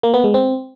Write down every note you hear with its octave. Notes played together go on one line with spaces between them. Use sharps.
A#3
B3
G#3
C4